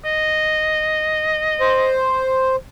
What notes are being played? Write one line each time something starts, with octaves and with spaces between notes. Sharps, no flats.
D#5
C5